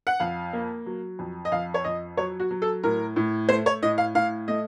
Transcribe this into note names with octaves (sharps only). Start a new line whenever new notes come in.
F#5
F2 F5
A#3
F#3
F2
D#5
F2 F5
C#5
F2 D#5
F#3 C#5
F#4
F#3
A4
A2 A#4
A2
A3 C5
C#5
A2 D#5
F5
A2 F5
A3 D#5